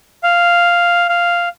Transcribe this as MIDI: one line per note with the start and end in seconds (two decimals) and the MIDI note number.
0.23 1.07 77
1.09 1.49 77